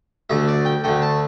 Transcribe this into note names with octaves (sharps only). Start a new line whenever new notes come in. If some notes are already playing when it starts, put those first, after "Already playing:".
D2 D3 A3 E5
D5
G5
D2 D3 A3 G5
A5